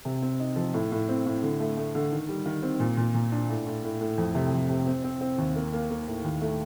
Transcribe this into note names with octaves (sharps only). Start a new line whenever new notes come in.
C3
C4
D#4
F3
A2
A2
C4
A2
D3
A3
A3
D3
D#3
G3
D#3
C4
A#2
A#2
A#2
D4
A2
A2
A2
A2
F2
C3
F2
C3
C4
C4
C4
D#2
A#3
A#3
A#3
A2
D#2
A3